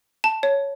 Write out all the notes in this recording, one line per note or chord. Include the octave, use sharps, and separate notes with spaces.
A5
C#5